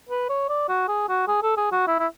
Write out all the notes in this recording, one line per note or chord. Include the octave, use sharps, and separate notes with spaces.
B4
C#5
D5
F#4
G#4
F#4
G#4
A4
G#4
F#4
E4
E4